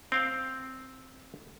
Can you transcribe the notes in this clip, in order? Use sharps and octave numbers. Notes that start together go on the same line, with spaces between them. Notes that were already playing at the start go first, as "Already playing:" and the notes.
C4 F5 G5